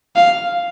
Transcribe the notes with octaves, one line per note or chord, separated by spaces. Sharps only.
F5